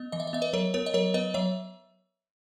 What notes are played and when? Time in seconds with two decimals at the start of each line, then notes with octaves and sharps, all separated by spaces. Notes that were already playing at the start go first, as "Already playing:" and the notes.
Already playing: B3 D#5
0.12 E3 D#5
0.20 E5
0.27 D#5
0.33 B3 E5
0.42 B4 D#5
0.53 F#3 A#4 C#5
0.74 B3 A#4 C#5
0.86 D#5
0.94 F#3 A#4 C#5
1.14 B3 B4 D#5
1.34 F#3 C#5 E5